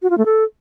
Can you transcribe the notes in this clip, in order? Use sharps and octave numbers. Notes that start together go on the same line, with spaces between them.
F#4
F4
A3
A4